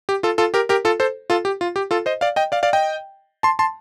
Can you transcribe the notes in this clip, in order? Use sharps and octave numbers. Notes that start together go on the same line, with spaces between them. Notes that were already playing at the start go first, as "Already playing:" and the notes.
G4
F4 A4
F4 A4
G4 A#4
G4 A#4
F4 A4
A4 C5
F4 A4
G4
F4
G4
F4 A4
C5 D#5
D5 F5
D#5 G5
D5 F5
D5 F5
D#5 G5
A5 C6
A5 C6